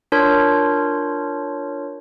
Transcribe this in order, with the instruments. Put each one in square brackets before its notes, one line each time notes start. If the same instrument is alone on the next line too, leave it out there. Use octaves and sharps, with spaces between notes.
[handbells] D4 F4 A#4 C#5 C6 G6